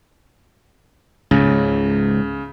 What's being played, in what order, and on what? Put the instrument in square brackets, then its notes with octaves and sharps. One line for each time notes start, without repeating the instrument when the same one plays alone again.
[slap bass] C#2 G#2 [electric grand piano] C#3